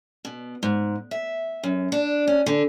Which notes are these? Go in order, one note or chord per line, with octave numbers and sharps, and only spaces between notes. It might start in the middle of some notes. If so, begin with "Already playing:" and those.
B2
G#2
E5
F#2
D4
C#4
D3